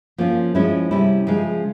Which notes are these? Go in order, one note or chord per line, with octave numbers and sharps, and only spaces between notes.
F3 A#3 C#4 F4
F3 G#3 C#4 E4
C3 G3 C#4 E4
C#3 F3 G#3